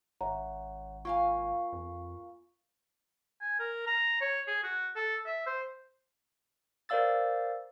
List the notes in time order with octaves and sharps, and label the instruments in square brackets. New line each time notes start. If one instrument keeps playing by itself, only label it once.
[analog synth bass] G#1 [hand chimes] C#5 F#5 [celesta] E5 A#5
[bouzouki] A#3 F5 G#5 [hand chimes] F4 C#6
[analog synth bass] F2
[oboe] G#5
A#4
A#5
C#5
G#4
F#4
A4
E5
C5
[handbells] A#4 C5 D5 F5 E6 A6